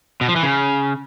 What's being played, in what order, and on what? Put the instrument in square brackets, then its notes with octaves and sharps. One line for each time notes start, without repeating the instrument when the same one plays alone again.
[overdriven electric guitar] B2
F3
E3
C#3